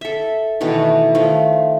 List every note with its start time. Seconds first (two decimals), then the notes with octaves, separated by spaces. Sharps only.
0.01 A4 E5
0.61 B2 D#3 E3 A3
1.15 D#3 F3 A3